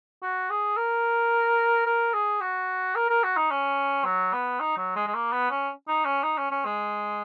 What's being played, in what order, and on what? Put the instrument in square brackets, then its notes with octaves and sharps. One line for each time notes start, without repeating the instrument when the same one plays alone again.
[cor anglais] F#4
G#4
A#4
A#4
G#4
F#4
A#4
A#4
F#4
D#4
C#4
F#3
B3
D#4
F#3
G#3
G#3
A#3
B3
C#4
D#4
C#4
D#4
C#4
C#4
G#3